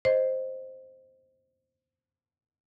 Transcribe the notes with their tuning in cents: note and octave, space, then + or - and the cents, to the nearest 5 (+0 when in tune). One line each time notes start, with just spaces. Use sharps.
C5 +0 D#5 +0